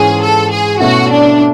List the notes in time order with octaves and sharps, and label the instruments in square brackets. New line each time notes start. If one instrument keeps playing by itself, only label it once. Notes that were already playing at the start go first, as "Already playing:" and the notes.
Already playing: [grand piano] G#2 E3 G#3 C#4 [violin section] G#4
[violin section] A4
G#4
[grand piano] B2 A3 C#4 E4 [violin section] F#4
[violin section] D4